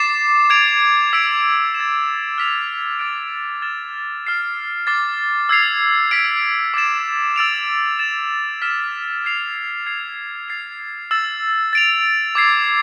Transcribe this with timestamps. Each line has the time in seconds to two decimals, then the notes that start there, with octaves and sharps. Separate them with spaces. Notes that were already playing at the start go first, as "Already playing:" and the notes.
Already playing: D6 A6 C7 E7
0.50 G#6 D7 F7
1.13 E6 B6 D7
1.74 E7
1.80 A6
2.38 F6 B6 F7
2.99 D6 F6 A6 D7
3.62 F6 A6 E7
4.25 F6 A6 C7 E7
4.87 D6 F6 A6 C7
5.49 E6 G#6 C7 F7
6.11 E6 B6 D7
6.74 D6 A6 E7
7.36 E6 A6 D7 F7
7.99 A6 E7
8.62 F6 B6 E7
9.24 G#6 C7 F7
9.86 G#6 C7 F7
10.48 A6 C7 F7
11.11 E6 A6 E7
11.73 A6 D7 F7
12.35 D6 G#6 C7